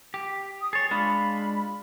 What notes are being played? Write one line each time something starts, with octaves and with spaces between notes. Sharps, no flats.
G4
D#6
G#4 C#5 A6
G#3 D4 F4 B5